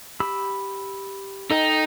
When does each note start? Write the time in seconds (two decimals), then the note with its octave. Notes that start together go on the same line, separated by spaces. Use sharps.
0.20 G4 B5 E6
1.51 D#4 A4 D#5 G5